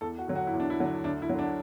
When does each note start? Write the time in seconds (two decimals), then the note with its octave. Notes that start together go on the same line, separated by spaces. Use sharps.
0.01 E2 A4
0.18 F#4
0.28 D3 F#3
0.35 F#4
0.47 E4
0.53 E2
0.60 D4
0.70 E4
0.79 D3 F#3
1.04 D2 D4
1.22 E4
1.29 F#3
1.35 D3 D4